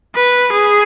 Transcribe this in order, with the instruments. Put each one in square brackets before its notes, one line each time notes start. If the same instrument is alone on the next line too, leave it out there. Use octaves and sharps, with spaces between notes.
[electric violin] B4
G#4